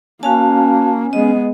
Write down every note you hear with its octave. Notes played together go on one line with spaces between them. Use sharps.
A#3 C#4 F#4 F5 A5
G#3 B3 D#5